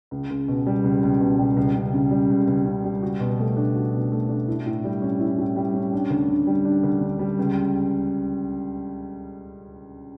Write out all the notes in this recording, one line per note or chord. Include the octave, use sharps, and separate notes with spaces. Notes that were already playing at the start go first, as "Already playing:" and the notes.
C#2
C#2
B2
G3
C#2
C#2
B2
G3
C#2
C#2
C#3
G3
C#2
C#2
C#3
G3
F#4
B2
A3
D4
F#4
B2
A3
D4
E4
A2
G3
C#4
E4
A2
G3
C#4
D4
D2
D3
G3
D4
D2
D3
G3
C#2